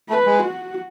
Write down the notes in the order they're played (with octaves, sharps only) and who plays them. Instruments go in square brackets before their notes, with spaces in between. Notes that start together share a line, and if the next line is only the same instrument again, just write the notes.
[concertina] A3 [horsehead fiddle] B4
[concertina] G#3
[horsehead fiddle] F#4